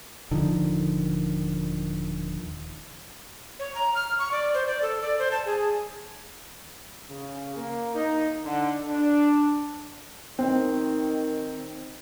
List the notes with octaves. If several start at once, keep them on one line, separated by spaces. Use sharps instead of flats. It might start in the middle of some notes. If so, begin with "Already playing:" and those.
D#1 D3 D#3 F3
C#5
A#5
F6
C#6
D5
C5
D5
A4
D5
C5
A5
G#4
C#3
A#3
D#4
D3
D4
D#3 C4